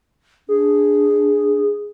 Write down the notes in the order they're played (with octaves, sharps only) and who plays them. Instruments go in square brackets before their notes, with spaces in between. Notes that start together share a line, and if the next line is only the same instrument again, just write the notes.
[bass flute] D4 [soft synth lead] G#4